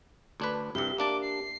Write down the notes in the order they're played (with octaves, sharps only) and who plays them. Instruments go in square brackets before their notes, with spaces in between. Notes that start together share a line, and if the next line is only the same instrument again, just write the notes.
[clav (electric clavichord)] D2 D4 B4
[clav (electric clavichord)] C2 G2 [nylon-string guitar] G4 E5 [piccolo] G7
[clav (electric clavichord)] A#3 D4 A5 [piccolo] D6
[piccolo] C7